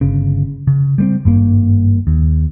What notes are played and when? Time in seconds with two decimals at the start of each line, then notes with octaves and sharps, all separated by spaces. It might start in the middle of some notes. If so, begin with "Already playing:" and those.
0.01 G1 C#3
0.67 C#3
0.98 G3 G#3 C4
1.25 G#1 G2 A#3
2.07 D#2